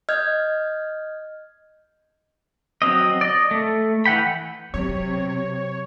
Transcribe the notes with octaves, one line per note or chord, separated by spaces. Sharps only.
D#5 F6 G6 G#6
F#3 C4 D#5
D5 D#5
A3
E3 F#5 G5 B5
C3 F#3 C#5